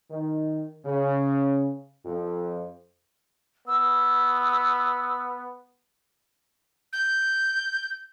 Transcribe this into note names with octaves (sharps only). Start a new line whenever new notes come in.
D#3
C#3
F2
B3 E6
G6